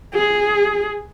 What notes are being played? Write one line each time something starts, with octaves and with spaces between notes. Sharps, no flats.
G#4